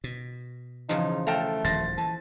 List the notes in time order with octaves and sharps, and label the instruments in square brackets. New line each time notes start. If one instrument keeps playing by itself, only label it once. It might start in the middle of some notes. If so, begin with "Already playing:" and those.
[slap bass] B2
[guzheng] E2 C#3 F3 [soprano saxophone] D#4
[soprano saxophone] A3 [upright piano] A4 F5 G5 [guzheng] A5 A#5
[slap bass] D#1 D#3 F3 [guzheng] C5 [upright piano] A6 A#6
[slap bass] E3 [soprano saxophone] A5